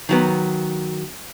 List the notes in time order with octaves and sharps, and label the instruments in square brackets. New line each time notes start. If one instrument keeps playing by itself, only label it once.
[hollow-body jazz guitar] D#3 F#3 B3